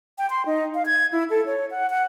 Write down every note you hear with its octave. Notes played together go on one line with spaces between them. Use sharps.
G5
C6
D#4
F5
G#6
E4
A4
C#5
F#5
F#5